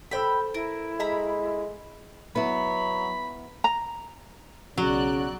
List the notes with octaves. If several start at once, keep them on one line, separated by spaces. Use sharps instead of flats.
A4 C5 G5 B5 E6
E4 A#4
G#3 E5 A#5 B5
F#3 B3 E4 B5
A#5
B1 C#3 F#3 F#4 D5 F#6